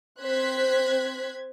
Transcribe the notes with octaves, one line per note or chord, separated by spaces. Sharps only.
C4 C5 F#6 G#6 B6